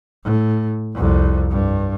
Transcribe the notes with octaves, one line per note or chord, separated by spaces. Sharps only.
A2
C2 F2
G2